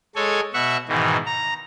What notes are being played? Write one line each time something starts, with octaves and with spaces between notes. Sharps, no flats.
G#3 A4 C#5 G#5
B2 E5 F#5 C#6
G#2 B2 D#3 E3
A#5